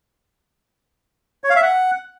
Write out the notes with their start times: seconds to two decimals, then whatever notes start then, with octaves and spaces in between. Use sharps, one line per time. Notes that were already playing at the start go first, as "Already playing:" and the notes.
1.44 C#5
1.50 F5
1.56 E5
1.62 F#5